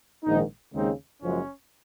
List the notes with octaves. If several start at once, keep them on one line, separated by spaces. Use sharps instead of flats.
A#1 G#2 D#3 D#4
D#2 C#3 G#3 C4 D#4
F#1 F#2 F3 G#3 C#4